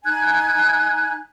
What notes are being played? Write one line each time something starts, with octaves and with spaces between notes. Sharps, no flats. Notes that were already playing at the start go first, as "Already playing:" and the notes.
D#4 G#5 F#6 G#6